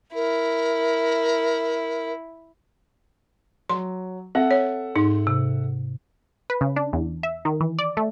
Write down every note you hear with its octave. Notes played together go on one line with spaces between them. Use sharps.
E4 A#4
F#3 C6
C4 A4 E5 F#5
C#5
G#2 D#4
C3
B4
C#3
D4
E2
E5
D#3
E3
D5
A3